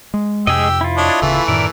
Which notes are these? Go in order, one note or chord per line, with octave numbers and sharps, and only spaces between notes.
G#3
F2 C3 G#3 G4 G#4 D#5 E6
E4 F4
D4 C#5 D#5
D1 C#3 E3 A3
F#2 A2 D#3 A#4 D5